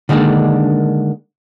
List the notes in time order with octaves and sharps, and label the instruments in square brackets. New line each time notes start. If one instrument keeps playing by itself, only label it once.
[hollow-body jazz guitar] D3 D#3 G#3 A#3 D4